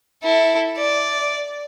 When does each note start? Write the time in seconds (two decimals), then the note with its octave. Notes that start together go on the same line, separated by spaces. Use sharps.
0.24 E4 A4
0.78 D5